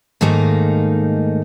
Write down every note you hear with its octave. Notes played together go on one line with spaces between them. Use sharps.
G#2 D#3 A3 A#3 D#4